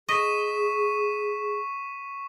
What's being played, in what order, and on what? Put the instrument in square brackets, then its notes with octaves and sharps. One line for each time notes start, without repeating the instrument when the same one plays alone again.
[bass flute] G#4 [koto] D#5 [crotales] C#6 B6 D#7